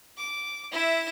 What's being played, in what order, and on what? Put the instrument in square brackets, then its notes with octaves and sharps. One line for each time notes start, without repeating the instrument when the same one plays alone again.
[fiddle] D6
E4 E5